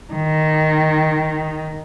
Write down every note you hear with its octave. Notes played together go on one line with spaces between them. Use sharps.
D#3